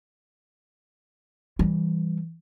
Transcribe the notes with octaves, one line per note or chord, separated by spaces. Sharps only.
E3 G3